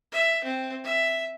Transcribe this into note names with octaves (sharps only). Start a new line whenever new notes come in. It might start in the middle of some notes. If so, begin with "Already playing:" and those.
E5
C4
E5